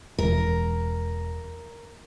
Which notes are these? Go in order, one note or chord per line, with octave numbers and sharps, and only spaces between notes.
E1 A#4